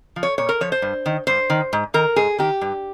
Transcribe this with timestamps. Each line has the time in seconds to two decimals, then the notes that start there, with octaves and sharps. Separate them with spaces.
0.16 F3
0.23 C#5
0.38 A#2 C#5
0.49 A#4
0.61 F3 C#5
0.72 C5
0.82 G2
1.06 D#3
1.27 G2 C5
1.50 D#3
1.73 G#2
1.94 D#3 A#4
2.16 G#2 G#4
2.39 D#3 G4
2.61 G2